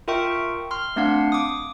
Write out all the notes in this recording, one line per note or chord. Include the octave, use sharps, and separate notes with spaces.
F4 A#4 E5 G5 C#6
C6 F6
A3 C4 D4 F5 F#5
D6 D#6